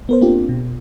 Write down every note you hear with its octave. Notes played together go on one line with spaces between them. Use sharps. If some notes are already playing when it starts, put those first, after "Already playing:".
B3 A#4 C5
A#3 C4 D4 F4 G4
B2